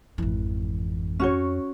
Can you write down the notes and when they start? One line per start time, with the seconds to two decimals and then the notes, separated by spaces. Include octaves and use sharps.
0.18 G#1 F2 E3
1.20 C#4 F#4 C#5